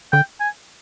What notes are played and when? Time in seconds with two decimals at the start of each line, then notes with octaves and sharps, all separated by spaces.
0.13 D3 G5
0.40 G#5